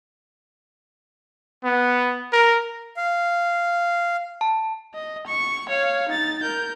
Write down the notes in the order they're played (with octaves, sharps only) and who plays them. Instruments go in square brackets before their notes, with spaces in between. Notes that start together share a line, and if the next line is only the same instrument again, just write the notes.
[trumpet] B3
A#4
[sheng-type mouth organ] F5
[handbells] A5
[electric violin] D#5
C#6 C#7
C#5 F5
D#4 A6
A#4 G6